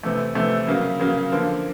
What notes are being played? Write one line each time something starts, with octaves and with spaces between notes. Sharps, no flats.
C3 E3 A3
C3 E3 A3
C#3 F#3 A#3
C#3 F#3 A#3
D3 F3 A#3